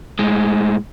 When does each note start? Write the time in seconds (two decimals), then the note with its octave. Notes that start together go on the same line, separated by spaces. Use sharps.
0.19 A2 G#3